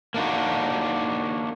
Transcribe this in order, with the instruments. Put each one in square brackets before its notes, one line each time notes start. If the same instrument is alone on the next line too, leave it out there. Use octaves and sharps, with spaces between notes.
[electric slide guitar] A#3 D4 D#4 F#4